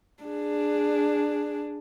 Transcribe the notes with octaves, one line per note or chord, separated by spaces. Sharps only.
D4 G#4